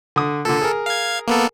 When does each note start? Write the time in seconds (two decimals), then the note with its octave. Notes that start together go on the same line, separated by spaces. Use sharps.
0.16 D3 D#6
0.45 A#2 D3 A4
0.62 G#4 A#4
0.86 F5 G#6
1.28 A#3 B3 A4